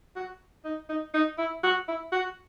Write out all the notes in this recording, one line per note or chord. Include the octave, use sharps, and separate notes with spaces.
F#4
D#4
D#4
D#4
E4
F#4
E4
F#4